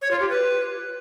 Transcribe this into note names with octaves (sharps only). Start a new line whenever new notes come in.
C#5
F4
G4
B4